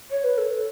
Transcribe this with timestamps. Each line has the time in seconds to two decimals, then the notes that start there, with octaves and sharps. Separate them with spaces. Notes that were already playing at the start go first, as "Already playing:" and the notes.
0.11 C#5
0.24 B4
0.38 A4